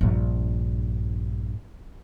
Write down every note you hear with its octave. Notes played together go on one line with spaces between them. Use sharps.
A#1 G2